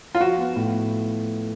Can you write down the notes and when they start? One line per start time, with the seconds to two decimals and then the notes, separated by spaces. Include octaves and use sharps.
0.15 F4
0.20 F3 F#4
0.38 B3
0.56 A2